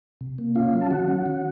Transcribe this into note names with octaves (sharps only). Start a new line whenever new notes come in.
C3
A#3
C#4 F4 F5
F#3
A5
D#3 F#4 F#5
C#4
D#3